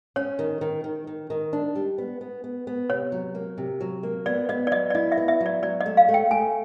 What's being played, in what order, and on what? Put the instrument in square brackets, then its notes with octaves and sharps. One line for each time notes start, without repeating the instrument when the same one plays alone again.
[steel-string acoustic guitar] C#4 [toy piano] C#5
[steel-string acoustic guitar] D#3
D#3
D#3
D#3
D#3
D4
G3
B3
B3
B3
B3
[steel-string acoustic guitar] C3 [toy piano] C#5
[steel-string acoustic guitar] F#3
A#3
C3
F#3
A#3
[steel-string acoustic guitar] B3 [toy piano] D5
[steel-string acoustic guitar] B3 [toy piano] D#5
[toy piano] D5
[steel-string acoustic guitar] F#3 [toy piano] D#5
[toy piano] D5
[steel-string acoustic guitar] E4 [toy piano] D#5
[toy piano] E5
[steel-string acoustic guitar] B3
[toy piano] E5
[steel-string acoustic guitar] F#3
[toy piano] D5
[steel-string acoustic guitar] F#3 [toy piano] D5
[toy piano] D#5
[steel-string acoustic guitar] A3
[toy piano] F5
[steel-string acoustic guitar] A3
[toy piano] G5
[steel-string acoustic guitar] A3 [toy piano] G#5